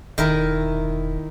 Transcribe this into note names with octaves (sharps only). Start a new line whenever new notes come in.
E1 D#3 E4 A#4